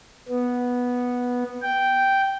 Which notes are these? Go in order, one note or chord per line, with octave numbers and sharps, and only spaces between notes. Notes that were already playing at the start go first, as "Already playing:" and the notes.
B3
G5